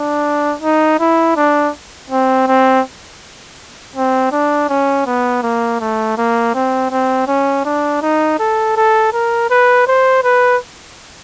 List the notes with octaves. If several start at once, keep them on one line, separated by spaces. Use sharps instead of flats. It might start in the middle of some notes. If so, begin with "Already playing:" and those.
Already playing: D4
D#4
E4
D4
C4
C4
C4
D4
C#4
B3
A#3
A3
A#3
C4
C4
C#4
D4
D#4
A4
A4
A#4
B4
C5
B4